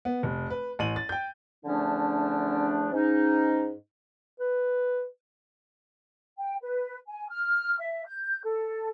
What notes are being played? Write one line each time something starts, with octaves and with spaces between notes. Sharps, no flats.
B3
F1
B4
A1 D#7 F#7
A6
G5 G6
E2 D3 F3 A3 C#4 D4
G#2 C#4 D#4
B4
G5
B4
G#5
F6
E5
G6
A4